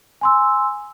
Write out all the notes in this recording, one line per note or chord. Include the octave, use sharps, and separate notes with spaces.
G#5 C6 E6